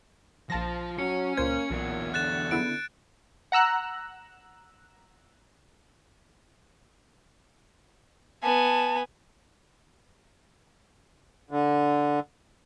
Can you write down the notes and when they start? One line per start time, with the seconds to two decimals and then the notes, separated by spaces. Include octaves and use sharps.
0.50 A#1 F3 F4 A5 A#6
0.99 F#3 C#4 C#7
1.37 C#2 A#2 A#3 C5 G#6
1.70 B1 E2 A#2 F#3
2.14 D3 F#6 A6 E7
2.51 C#3 B3 E4 D7
3.52 F#5 A#5 E6 F#6
8.43 B3 G#5 A5
11.51 D3